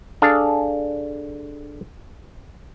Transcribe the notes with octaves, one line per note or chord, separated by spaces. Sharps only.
D4 G#4 A4 F5